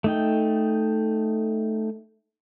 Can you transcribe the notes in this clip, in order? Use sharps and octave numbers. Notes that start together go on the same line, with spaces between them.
A3 D#4 G5